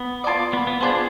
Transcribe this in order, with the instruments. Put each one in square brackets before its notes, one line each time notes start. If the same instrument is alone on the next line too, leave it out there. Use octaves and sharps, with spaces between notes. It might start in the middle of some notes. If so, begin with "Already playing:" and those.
Already playing: [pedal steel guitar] B3
[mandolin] F4 A4 D5
[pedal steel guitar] B3
B3
[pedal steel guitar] B3 [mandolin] D4 F4 G#4 C5